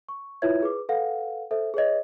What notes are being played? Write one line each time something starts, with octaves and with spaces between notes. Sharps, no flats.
C#6
E4 F4 B4 C#5 E5 G#6
G#4 B4 D6
A4 B4 F5 F#5
A4 C5 E5
G#4 B4 C#5 D#5